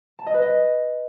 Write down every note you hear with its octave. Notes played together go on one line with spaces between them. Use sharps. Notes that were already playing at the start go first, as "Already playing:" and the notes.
A5
D#5
B4
D#5